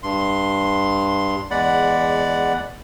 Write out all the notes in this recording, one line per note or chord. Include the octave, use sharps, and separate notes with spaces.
G2 C6
E2 G#3 D5 F#5 B5